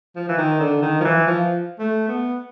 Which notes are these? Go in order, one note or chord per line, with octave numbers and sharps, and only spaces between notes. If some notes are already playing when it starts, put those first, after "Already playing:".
F3
E3
D#3
D3
D#3
F3
E3
F3
A3
B3